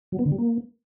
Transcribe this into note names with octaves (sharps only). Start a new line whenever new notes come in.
F#3
B3
D3
G3
A#3